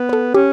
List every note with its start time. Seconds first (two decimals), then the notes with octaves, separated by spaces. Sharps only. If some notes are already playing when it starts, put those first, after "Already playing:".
Already playing: B3
0.09 B4
0.13 A4
0.34 C#4 G4